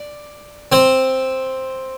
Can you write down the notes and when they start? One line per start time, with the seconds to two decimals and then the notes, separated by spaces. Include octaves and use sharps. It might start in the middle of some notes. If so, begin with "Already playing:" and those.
Already playing: D5
0.72 C4 C5